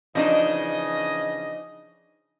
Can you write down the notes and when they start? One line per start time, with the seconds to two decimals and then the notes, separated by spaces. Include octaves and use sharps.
0.15 C#3 E3 F3 D4 D#4 D#5